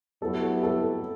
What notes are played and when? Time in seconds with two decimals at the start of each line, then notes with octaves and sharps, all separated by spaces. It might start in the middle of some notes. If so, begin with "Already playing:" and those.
0.22 A2 F#3 B3 E4 G4 A4
0.63 A4